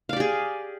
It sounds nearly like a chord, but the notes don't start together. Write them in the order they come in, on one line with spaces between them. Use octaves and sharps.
F5 D5 G4 G#4